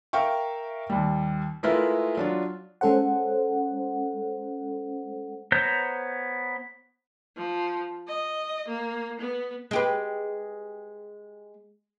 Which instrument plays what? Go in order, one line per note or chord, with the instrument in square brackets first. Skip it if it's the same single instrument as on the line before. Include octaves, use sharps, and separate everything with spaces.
[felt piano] A#4 E5 F5 G5 C#6
D#2 G3
G#3 A3 E4 F4 A#4 B4
F#3 D4 F4
[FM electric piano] G#3 C#4 A4 C5 F#5
[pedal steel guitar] B3 C5 C#5 A#5 G6
[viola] F3
D#5
A#3
B3
[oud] G#3 G4 B4